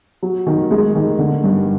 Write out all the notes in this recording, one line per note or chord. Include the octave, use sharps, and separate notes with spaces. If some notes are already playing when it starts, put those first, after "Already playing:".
F#3
D#3
G#3
D#3
D3
G2